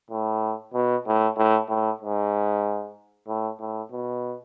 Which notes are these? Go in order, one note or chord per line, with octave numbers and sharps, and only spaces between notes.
A2
B2
A2
A2
A2
G#2
A2
A2
B2